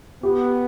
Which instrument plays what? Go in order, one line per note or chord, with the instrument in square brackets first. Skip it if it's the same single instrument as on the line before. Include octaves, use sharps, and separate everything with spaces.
[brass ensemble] B3 [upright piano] G4